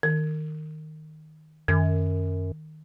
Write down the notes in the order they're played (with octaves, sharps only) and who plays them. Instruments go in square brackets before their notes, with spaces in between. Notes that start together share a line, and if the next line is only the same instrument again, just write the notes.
[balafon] D#3
[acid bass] F#2 [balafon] D#3